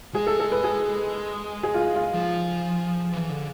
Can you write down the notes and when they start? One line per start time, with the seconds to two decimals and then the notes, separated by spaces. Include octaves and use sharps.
0.14 G#3 G#4
0.27 A4
0.40 A4
0.52 B4
0.64 G#4
1.63 G#4
1.74 F4
1.95 F4
2.14 F3
3.12 E3
3.30 D3